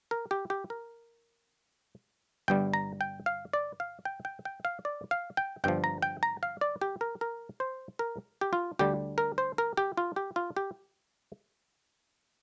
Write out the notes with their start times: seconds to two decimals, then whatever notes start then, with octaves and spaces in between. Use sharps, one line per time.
0.11 A#4
0.31 G4
0.50 G4
0.70 A#4
2.48 G1 G2 G3 G5
2.74 A#5
3.01 G5
3.26 F5
3.53 D5
3.80 F5
4.05 G5
4.25 G5
4.45 G5
4.65 F5
4.85 D5
5.11 F5
5.37 G5
5.64 G1 G2 F3 G5
5.84 A#5
6.02 G5
6.23 A#5
6.43 F5
6.61 D5
6.81 G4
7.01 A#4
7.21 A#4
7.60 C5
7.99 A#4
8.41 G4
8.53 F4
8.79 D2 D3 G3 G4
9.18 A#4
9.38 C5
9.58 A#4
9.77 G4
9.97 F4
10.16 G4
10.36 F4
10.57 G4